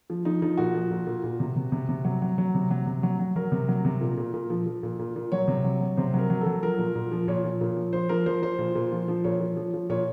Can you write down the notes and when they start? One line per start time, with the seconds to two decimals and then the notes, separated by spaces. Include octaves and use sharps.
0.10 F3
0.25 F3 D#4
0.42 F3 D#4
0.58 A#2 F#4
0.74 F3
0.91 A#2
1.07 A#2
1.24 A#2
1.40 C3
1.56 C3
1.72 C3
1.89 C3
2.05 F#3
2.22 F#3
2.38 F#3
2.54 C3
2.71 F#3
2.87 C3
3.03 F#3
3.19 F#3
3.36 F#3 A#4
3.52 C3
3.68 F#3
3.85 C3
4.01 A#2
4.17 A#2
4.34 A#2
4.50 F3
4.66 F3
4.83 A#2
4.99 A#2
5.16 A#2
5.32 F#3 C#5
5.48 C3
5.64 F#3
5.81 F#3
5.97 C3 C5
6.14 F#3 A#4
6.30 F#3
6.41 A4
6.46 F#3
6.63 F3 A#4
6.78 A#2
6.95 A#2
7.12 F3
7.28 A#2 C#5
7.44 F3
7.61 A#2
7.77 F3
7.93 F3 C5
8.09 F3 A#4
8.26 F3 C5
8.42 F3 C5
8.59 A#2
8.75 A#2
8.92 F3
9.08 F3
9.24 A#2 C#5
9.40 F3
9.57 F3
9.74 F3
9.89 A#2 C#5